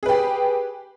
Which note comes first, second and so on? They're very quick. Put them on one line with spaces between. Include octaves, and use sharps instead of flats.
G#4 B4 G4